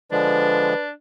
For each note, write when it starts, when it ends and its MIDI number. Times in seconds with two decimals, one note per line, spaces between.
0.12 0.74 50
0.12 0.74 53
0.12 0.74 56
0.12 0.92 62
0.12 0.84 71